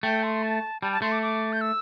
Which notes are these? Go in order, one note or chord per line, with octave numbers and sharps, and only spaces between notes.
A3 G5
C6
A5
G3 A5
A5
A3 C6
D6
D6
G6
E6